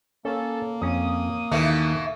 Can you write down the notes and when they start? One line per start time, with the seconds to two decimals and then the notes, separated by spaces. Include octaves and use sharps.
0.25 A#3 C#4 A4
0.82 F2 C#4 D#6
1.52 D#2 B2 D#3 E3 A3